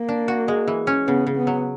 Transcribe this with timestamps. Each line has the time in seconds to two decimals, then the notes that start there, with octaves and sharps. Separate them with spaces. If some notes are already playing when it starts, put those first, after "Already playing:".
Already playing: A#3
0.09 D4
0.28 F#4
0.48 G#3
0.68 E3
0.87 C#4
1.07 C#3 B3
1.27 C#3
1.37 B3
1.47 F#3